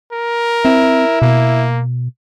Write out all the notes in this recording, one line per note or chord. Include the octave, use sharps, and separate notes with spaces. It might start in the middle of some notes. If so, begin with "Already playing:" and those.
A#4
C4 E4
B2 A#3